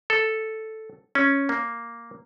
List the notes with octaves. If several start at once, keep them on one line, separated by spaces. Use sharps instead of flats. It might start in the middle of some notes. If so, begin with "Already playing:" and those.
A4
C#4
A#3